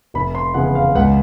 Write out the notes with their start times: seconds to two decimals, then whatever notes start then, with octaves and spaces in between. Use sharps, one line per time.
0.14 F1 B5
0.35 C6
0.54 E2 C#3 F3 F#5
0.75 F5
0.95 C#2 F#5